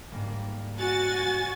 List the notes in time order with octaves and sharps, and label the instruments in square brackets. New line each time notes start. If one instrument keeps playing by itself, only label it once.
[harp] G#2 G3 A#3
[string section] F#4 G#5 A6